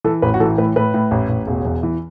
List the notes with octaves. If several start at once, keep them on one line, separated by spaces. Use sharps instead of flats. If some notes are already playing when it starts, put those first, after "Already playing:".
E3 A4
A1 B4
F#4
E3 A4
A2 B4
A2 B4
A2
A1
A1
E1
E2
E3